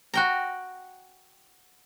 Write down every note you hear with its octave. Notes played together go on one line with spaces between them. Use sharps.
F#4 G5 A#5